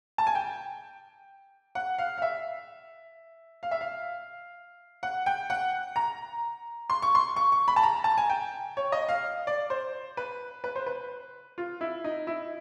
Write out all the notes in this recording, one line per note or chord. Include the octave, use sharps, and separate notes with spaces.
A5
G#5
G5
F#5
F5
F5
E5
F5
E5
F5
F#5
G5
F#5
A#5
C6
C#6
C6
C#6
C#6
B5
A5
A#5
A5
G#5
G5
C#5
D#5
F5
D5
C5
B4
B4
C5
B4
F4
E4
D#4
E4